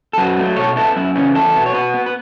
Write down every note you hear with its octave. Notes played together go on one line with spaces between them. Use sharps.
A4
F#2 F#4 B4
F#3 A3
B2 A4 C#5
B3 E4 A4
F#2 E4
C#3 E3 B3 C#4
E2 E4 A4
B2 B3
C#5
B2 F#4 B4
B3
B4